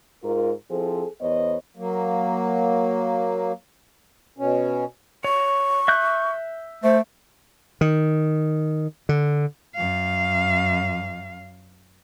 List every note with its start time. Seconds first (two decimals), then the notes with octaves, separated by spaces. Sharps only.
0.23 G#2 F4 A#4
0.70 F3 C4 E4 G#4 A4
1.21 E2 B3 C5 C#5 D#5
1.77 F#3 A#3
4.38 B2 C#4
5.24 C#5 C#6
5.88 E5 F#6 G6
6.84 A3 C5
7.81 D#3
9.09 D3
9.75 F#2 F5